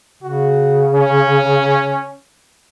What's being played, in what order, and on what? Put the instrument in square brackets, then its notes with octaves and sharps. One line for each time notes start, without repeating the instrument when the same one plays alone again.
[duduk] C#3 [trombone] F#4
[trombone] C#4